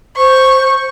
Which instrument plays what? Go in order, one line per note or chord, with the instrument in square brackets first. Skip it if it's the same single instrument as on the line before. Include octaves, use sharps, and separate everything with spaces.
[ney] C5 [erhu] C#6